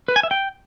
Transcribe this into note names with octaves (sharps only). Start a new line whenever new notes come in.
B4
G#5
E5
G5